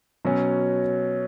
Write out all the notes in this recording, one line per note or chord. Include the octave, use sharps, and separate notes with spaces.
B2 F#3 C#4